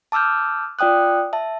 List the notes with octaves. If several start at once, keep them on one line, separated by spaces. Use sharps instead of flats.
A5 D6 E6 F6 G6
F4 D5 G5 D#6 F#6
E5 A5